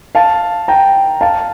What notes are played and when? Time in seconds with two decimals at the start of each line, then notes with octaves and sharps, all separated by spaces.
0.15 F5 A5
0.68 G5 A#5
1.21 F5 A5